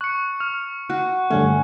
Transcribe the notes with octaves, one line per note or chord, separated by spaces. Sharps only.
C#6 F#6 C#7
F6
F#4 F#6
G2 D3 A3 C#4